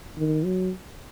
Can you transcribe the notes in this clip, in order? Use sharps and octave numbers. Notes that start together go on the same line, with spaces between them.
D#3
F#3